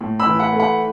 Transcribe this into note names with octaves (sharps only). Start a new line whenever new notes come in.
A2
B5 E6
E3
F#5 B5
A3
F#5 B5